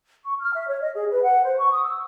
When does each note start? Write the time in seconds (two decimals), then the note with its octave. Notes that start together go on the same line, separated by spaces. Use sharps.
0.24 C#6
0.40 F6
0.53 E5
0.68 C#5
0.82 D#5
0.95 G#4
1.11 B4
1.23 F#5
1.43 C5
1.58 C#6
1.71 D#6
1.84 E6